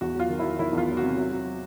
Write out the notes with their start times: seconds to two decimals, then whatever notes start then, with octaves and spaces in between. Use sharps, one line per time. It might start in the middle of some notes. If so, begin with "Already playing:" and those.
0.01 E2 F#4
0.15 F#3 F4
0.29 D#3
0.39 F#3 E4
0.59 D#3 E4
0.73 E2
0.78 F4
0.88 F#3
0.97 F#4
1.02 C3
1.17 F#3
1.32 F#3